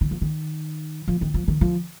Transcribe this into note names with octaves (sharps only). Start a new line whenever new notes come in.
D#3
F3
D#3
F3
D#3
F3
D#3
F3